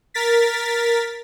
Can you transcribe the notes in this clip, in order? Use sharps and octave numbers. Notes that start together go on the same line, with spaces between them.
A#4 A6 B6